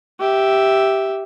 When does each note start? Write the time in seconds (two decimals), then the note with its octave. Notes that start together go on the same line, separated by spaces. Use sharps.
0.20 G4 E5